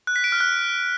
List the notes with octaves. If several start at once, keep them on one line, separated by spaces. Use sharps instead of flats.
F#6
B6
D7
F6
F#6